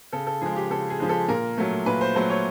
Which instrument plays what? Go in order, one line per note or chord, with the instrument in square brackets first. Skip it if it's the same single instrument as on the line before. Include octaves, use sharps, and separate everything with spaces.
[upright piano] C#3 A4
A4
F3 G#3 G#4
G4
C#3 A4
G#4
F3 G#3
A4
A#2 A#4
F#3 A3
A#2 B4
C5
F#3 A3 C5
C#5